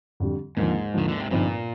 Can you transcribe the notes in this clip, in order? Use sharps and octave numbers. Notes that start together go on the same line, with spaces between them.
F2 D3 G3
D#2 G#2 D3 F3
D#2 D3 D#3 F3
D3
C3
G1 G2 A#2 F3 C4 D#4